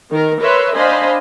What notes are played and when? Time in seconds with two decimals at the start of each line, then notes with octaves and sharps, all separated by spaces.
0.11 D#3 A#4
0.40 A#4 B4 C#5 E5 C6
0.75 D4 C5 D#5 F5 G#5 B5